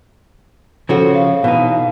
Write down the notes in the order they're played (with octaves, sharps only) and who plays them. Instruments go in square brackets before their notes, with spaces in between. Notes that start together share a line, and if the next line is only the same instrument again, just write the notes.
[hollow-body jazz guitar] C#3 F3 F#4 [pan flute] A4
[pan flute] F5
[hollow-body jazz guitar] B2 E3 D#4